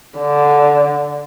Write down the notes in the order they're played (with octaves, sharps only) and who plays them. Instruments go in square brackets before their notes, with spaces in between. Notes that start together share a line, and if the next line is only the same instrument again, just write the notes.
[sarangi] D3